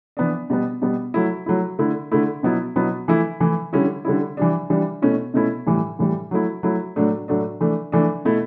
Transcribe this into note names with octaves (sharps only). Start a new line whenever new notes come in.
E3 B3 D4
B2 G3 B3
B2 G3 B3
F#3 A3 E4
F#3 A3 E4
D3 A3 E4
D3 A3 E4
B2 F#3 B3 E4
B2 F#3 B3 E4
E3 A3 E4
E3 A3 E4
D3 G3 C#4 E4
D3 G3 C#4 E4
E3 G3 D4
E3 G3 D4
B2 A3 C#4 E4
B2 A3 C#4 E4
A2 E3 G3
A2 E3 G3
F#3 A3 E4
F#3 A3 E4
A2 F#3 A3 D4
A2 F#3 A3 D4
E3 A3 D4
E3 A3 D4
B2 A3 E4